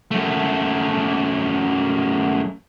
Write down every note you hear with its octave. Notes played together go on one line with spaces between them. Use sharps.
F#2 A3